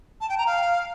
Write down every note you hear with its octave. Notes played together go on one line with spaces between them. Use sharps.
A5
G5
A#5
F5